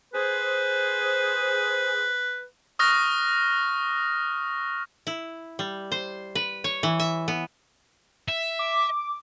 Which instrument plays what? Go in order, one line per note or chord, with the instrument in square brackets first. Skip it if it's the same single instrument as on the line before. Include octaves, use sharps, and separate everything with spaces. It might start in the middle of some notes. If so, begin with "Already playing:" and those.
[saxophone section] G#4 C5 [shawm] B4
[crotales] C#6 D#6 F6 F#6 A#6
[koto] E4
G3
C5
B4
C#5
E3
E5
B3
[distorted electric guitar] E5
[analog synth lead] D6